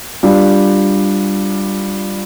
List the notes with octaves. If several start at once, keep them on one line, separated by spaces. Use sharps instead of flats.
G3 D4 F4